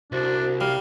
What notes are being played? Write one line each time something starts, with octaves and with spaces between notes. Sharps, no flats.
C2 D4 F#4 C5
G3 F5